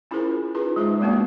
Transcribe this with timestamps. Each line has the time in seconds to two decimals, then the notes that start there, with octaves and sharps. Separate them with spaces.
0.11 C#4 E4 F4 G#4 A#4 C5
0.55 D#4 F4 G#4 B4
0.76 G#3 D#4 C5 E5
1.00 G3 G#3 A#3 B3 D4 F#4